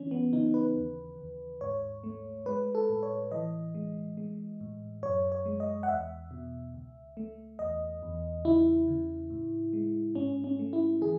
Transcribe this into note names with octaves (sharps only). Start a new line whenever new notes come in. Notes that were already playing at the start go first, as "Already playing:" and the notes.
Already playing: E3 C#4
B3
C#3 D#4
B4
D#2
D#2
G#2 C#5
A3
G#3 B4
A4
A2
C#5
E3 D#5
G#3
G#3
A2
F#2 C#5
C#5
G#3
D#5
F#5
E2 E5
B2
C#2
A3
E2 D#5
E2
C#3 E4
C#3
A2
G#3
G#2 C#4
C#4
A3
E4
E3 G#4